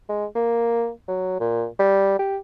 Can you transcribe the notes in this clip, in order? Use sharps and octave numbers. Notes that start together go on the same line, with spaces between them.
G#3
A#3
F#3
A#2
G3
G4